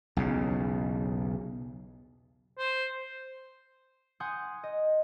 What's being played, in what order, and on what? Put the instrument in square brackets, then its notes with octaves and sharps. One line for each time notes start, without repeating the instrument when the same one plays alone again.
[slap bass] B1 E2 C#3
[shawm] C5
[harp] F#5 G#5 C6 D#6 G6
D#5